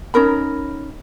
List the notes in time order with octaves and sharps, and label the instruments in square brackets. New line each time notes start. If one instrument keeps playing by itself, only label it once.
[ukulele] C#4 D#4 A#4 B5